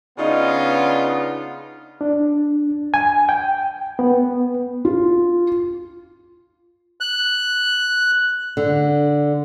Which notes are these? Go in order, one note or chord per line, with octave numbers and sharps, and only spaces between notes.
C#3 B3 D4 D#4 F4 D#5
D4
G#5
G5
B3
F4
F#6
D3